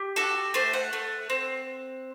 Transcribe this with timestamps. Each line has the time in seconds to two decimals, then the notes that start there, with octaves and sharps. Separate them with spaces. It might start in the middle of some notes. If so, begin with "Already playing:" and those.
Already playing: G4
0.16 F#4 A4
0.54 A3 C5
0.73 F#5
0.93 A3
1.30 C4